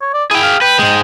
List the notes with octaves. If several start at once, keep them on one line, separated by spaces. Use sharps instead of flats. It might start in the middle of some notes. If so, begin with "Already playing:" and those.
C#5
D5
E4 G#4 G5
F5
B4 G5
G#2 G#3